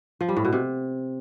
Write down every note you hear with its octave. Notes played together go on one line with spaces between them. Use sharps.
F3
G3
A2
B2
C3